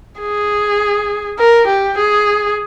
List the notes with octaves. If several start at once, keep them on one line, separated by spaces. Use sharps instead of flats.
G#4
A#4
G4
G#4